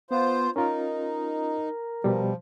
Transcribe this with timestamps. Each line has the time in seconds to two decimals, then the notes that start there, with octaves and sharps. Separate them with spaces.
0.11 B3 F4 C5
0.56 C#4 D#4 F4 A#4
2.04 B2 F3 G3